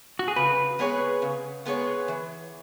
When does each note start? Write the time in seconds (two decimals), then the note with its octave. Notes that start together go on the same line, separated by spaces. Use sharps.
0.19 F#4
0.28 G#4
0.36 C#3 B4
0.79 G#3 B3 G#4 C#5
1.22 C#3
1.65 G#3 B3 G#4 C#5
2.08 E3